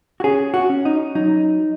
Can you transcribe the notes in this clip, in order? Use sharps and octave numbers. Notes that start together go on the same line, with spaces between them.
F#4
C#4 G#4
F#4
C#4
D#4
F#3 D#4